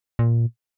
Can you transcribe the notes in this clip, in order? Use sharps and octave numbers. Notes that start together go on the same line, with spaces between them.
A#2